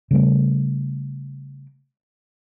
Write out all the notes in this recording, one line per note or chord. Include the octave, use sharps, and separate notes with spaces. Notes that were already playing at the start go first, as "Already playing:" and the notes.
C#3 G3 A3